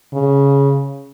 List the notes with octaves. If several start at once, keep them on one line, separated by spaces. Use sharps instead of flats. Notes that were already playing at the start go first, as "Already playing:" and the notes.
C#3